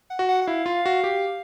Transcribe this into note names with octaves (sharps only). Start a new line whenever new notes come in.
F#5
F#4
F#5
F#5
E4 F5
F4
F#4
G4